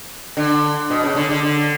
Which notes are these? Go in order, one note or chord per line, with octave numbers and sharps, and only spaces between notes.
D3
B2
C#3
D3
D3
D3